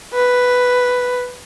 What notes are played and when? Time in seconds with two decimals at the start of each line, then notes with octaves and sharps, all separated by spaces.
0.13 B4